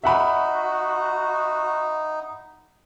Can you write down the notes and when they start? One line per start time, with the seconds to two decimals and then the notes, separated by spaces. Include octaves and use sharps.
0.04 D#4 F#4 E5 F#5 B5